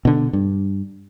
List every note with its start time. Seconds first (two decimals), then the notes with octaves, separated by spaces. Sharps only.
0.05 B2 D3
0.33 G2